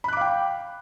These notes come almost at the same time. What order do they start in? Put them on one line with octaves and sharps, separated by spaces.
B5 F#6 D6 F5 G5